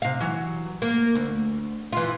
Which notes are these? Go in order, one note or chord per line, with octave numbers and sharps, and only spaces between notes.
C3 F5
E3 F#3
A#3
D2
E3 F4